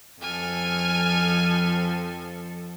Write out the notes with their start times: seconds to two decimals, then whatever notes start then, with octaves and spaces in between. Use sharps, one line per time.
0.21 F2 F3 A4 G#5 F6